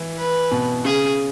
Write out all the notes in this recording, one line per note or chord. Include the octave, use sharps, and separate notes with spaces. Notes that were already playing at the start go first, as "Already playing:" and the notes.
Already playing: E3
B4
B2
C#3 G#4